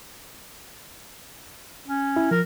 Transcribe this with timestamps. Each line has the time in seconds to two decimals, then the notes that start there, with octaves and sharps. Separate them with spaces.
1.87 C#4
2.16 E4
2.31 F3 A#4